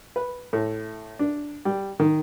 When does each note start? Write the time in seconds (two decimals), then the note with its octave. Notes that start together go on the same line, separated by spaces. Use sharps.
0.16 B4
0.53 A2
1.19 D4
1.65 G3
2.00 D#3